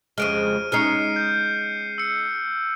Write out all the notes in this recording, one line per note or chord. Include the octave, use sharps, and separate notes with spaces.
F2 C#3 G#3 F6 D7 D#7
F6
G#3 C#4 D#4 F6 C7 C#7
G6
E6 C#7